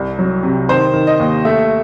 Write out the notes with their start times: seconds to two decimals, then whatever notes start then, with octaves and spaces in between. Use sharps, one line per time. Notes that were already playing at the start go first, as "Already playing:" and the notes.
Already playing: C2
0.19 F#3
0.43 C3
0.69 D#3 C5
0.94 D#3
1.07 D#5
1.19 D#2
1.45 A3 E5